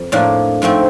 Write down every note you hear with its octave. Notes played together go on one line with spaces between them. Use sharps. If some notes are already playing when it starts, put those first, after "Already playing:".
Already playing: F2
A2 F3 A#3 D4
G#2 F3 A3 C4